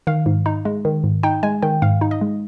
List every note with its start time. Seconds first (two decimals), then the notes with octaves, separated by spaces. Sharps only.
0.07 D#3 F5
0.26 G#2
0.46 D#4
0.65 G#3
0.85 D#3
1.04 G#2
1.23 D#4 G5
1.43 G#3 G#5
1.62 D#3 G5
1.82 G#2 F5
2.01 D#4
2.11 D#5
2.21 G#3